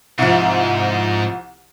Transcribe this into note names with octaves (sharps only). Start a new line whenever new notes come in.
C2 G#2 F3